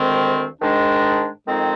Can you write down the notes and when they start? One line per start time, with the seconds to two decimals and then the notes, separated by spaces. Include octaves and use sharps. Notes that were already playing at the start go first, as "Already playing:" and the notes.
Already playing: D2 C3 D#3 G#3 C4
0.60 G#2 D#3 G#3 D4
1.45 F2 D#3 G#3 C4 D#4